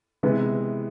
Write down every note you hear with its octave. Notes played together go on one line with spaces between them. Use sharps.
C3 E3 G#3 B3